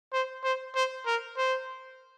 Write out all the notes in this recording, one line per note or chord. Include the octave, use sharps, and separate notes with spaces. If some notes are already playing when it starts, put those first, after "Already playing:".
C5
C5
C5
A#4
C5